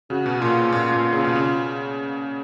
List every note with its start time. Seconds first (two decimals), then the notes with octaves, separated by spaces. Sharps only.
0.10 C#3 F#4
0.26 B2
0.41 A#2 F4
0.72 A#2
0.92 A#2
1.13 C#3
1.24 B2
1.36 C#3